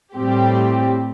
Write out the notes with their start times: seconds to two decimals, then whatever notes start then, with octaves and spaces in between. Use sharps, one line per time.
0.14 A2 G3 C4 G4